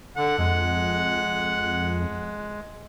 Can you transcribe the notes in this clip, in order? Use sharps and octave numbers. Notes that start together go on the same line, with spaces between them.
D3 F#5
F2 G#3